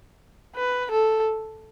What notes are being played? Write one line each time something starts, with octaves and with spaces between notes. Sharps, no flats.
B4
A4